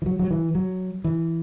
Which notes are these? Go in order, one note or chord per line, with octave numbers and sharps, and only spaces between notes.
E3
F#3
F#3
E3
F#3
E3